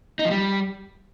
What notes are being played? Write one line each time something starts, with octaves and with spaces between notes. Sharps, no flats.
D#4
F3
G3